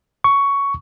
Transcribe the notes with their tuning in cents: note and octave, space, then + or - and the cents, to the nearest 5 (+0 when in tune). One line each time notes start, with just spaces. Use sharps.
C#6 +10